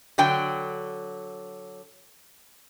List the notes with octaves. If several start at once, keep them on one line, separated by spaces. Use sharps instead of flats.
D3 F#3 G5